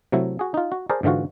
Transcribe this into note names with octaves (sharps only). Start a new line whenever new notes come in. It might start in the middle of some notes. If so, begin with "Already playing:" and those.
C3 F#3 A3 E4
F#4 G#4
D#4 F4
F#4
G#4 A#4 C5 D5 A5 A#5
G#2 D3 E3 F4 F#4